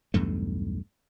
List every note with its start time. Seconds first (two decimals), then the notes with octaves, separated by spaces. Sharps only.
0.14 B1 E2 G2 A3